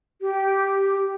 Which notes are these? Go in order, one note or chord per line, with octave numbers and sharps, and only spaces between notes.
G4